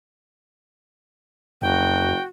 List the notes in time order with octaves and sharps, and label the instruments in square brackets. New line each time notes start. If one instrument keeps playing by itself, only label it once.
[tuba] F#1 [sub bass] F2 [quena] F#4 [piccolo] G5